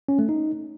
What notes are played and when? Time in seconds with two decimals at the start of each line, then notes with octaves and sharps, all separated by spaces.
0.09 C#4
0.19 A3
0.29 D#4